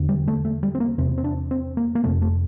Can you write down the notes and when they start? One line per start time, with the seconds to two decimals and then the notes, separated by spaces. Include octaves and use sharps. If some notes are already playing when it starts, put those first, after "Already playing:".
Already playing: E2 D3
0.09 G3
0.28 A3
0.45 A3
0.63 G3
0.75 C4
0.80 A#3
0.98 E2 C3 C4
1.18 C4
1.24 D4
1.51 C4
1.77 A#3
1.95 A#3
2.04 F2 C3 A3
2.22 A3